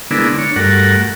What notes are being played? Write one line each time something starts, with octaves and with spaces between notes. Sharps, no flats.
D3 G#3 A#3 B3 D4 E4
D4 C#5
G2 A3 F#4 A#4 F#5